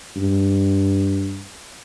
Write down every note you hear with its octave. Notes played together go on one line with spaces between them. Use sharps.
G2